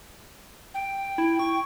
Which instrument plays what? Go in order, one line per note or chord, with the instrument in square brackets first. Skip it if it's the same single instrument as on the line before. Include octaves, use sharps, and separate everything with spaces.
[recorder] G5
[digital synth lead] E4
C#6